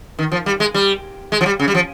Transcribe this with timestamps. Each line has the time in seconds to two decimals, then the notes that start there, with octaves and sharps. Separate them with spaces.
0.19 D#3
0.32 F3
0.46 G3
0.60 G#3
0.74 G3
1.32 G#3
1.41 F3
1.46 G3
1.60 C#3
1.68 G3
1.75 F3